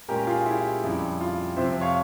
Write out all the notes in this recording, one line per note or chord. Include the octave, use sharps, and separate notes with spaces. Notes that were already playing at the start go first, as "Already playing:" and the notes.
A#2 G#3 C#4 G4 A#4
F4 G#4
E4 G4
F2 C#3 G3 E4
F4
F2 C3 F3 C4 C5 E5
C#5 F5